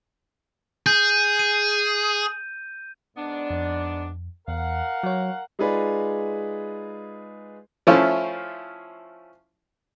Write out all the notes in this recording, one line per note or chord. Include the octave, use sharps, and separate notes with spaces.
G#4 G6
D#7
G#2 B3 D4
F2
E2 A#4 F5 F#5
F#3 C#5
G#3 D#4 F4 G#4 B4 D5
F3 A3 C#4 E4 F4